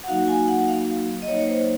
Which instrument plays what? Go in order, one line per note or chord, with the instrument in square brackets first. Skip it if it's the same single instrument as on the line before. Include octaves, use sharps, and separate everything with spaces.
[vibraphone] F#5
F#3 A#3 D#4 F#4 F5
G#5
F#5
F5
D#5
F#3 A#3 D#4 C#5
C#5
C5